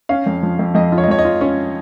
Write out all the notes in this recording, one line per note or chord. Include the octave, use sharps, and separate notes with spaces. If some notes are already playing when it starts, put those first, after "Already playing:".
C#4 F5
F2
F3
F2
F2 D#5
F4
C#5
D#5
F2 C#5
D#5
F4
C#4 C#5